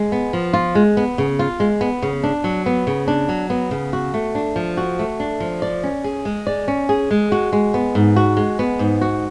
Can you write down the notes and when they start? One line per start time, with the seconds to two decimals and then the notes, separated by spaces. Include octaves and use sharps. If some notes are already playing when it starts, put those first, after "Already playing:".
Already playing: G#3
0.12 B3
0.33 F3
0.53 F4
0.75 G#3
0.97 B3
1.18 C#3
1.39 F4
1.60 G#3
1.81 B3
2.02 C#3
2.23 D4
2.44 F#3
2.66 B3
2.87 C#3
3.08 D4
3.29 F#3
3.50 B3
3.71 C#3
3.93 F#4
4.14 A3
4.35 D4
4.56 F3
4.77 F#4
4.99 A3
5.20 D4
5.40 F3
5.62 D5
5.84 C#4
6.04 G#4
6.25 G#3
6.47 D5
6.68 C#4
6.89 G#4
7.11 G#3
7.32 F#4
7.53 G#3
7.74 B3
7.95 G#2
8.16 F#4
8.37 G#3
8.59 B3
8.79 G#2
9.01 F#4